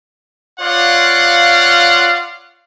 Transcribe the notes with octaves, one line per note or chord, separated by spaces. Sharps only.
F4 C#5 D5 F5 F#5